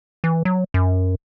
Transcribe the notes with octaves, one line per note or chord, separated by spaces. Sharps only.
E3
F#3
F#2